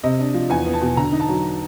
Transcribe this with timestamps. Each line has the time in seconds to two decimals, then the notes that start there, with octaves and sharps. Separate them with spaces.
0.04 C3 D#5
0.19 D4
0.34 F3
0.50 E2 G#5
0.66 B3
0.73 A5
0.82 B2
0.97 D3 A#5
1.12 D#4
1.20 A5
1.29 F#3